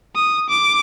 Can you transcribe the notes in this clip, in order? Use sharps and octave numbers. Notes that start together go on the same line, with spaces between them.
D#6
D6